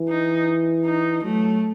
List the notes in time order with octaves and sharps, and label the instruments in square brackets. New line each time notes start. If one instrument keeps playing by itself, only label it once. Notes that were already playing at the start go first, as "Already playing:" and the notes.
Already playing: [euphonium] E3
[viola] D#4
D#4
[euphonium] F#3 [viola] A3